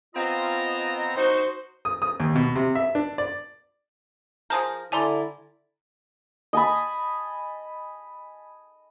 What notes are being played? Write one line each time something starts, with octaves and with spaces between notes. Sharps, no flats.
B3 C4 F4 D#5 A#5
D#4 F#4 C5
D#6
D#6
D#2
B2
C3
E5
D4
D5
F3 G#4 A#4 C5 A5 G6
D3 G3 E4 A4 D5 G#5 A#5 C6
D#5 G#5 A5 B5